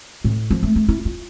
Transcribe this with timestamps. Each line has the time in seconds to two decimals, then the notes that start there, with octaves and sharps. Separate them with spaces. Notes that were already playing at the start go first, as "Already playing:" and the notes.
0.24 A2
0.50 F3
0.63 A3
0.76 A3
0.88 E4
1.05 F4